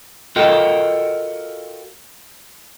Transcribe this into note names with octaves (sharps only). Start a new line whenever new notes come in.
F4 F#4 A4 A#4 D#5 G5